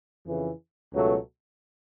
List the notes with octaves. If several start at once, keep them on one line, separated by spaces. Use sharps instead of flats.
F2 C#3 E3
C#2 B2 F#3 A3